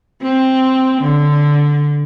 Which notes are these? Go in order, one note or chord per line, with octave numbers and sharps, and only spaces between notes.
C4
D3